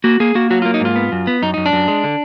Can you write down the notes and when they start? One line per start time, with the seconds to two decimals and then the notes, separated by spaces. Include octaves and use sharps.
0.04 A#3 F#4
0.20 A#3 G#4
0.35 A#3 F#4
0.50 F#3 F#4
0.62 A#3 F4
0.74 D#4
0.81 G#2 F4
0.96 B3
1.12 F#2
1.27 B3
1.42 F#2 D#4
1.54 F#2 D#4
1.66 D4
1.73 F#2
1.88 G#3
2.04 D3